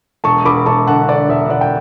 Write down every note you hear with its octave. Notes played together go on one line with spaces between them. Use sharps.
E1 A5 C#6
E1 B5 D6
E1 A5 C#6
D3 F#5 A5
D3 D5
E1 E5
E1 D5 F#5
G5